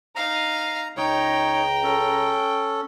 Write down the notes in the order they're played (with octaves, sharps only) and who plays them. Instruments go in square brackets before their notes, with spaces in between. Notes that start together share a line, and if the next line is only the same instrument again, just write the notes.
[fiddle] D#4 F5 [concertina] A#5
[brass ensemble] C#2 A#5 [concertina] D#4 C#5 [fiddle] G5
[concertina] C#4 A4